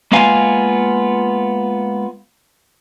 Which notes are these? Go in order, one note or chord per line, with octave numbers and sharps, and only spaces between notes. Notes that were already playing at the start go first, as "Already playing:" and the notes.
G#3 A#3 B3 F4 F5 G#5